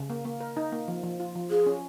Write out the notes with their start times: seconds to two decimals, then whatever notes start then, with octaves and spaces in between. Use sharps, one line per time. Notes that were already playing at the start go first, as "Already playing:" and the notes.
Already playing: C#3
0.10 A#3
0.25 A#3
0.41 A#4
0.57 D#4
0.72 A#3
0.88 F3
1.03 F3
1.20 F4
1.35 F3
1.51 F4 G#4
1.66 C#4